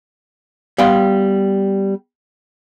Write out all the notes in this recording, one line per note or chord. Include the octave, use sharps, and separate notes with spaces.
G3 B3 F5 G5 C6